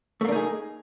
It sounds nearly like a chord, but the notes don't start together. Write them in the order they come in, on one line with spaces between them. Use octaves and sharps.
A3 A#3 D4 D#4 G#4